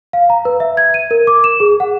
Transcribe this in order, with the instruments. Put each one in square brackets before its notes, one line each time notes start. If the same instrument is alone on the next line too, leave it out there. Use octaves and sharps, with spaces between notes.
[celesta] F5
A#5
B4
E5
G#6
D#7
A#4
D6
E7
G#4
F#5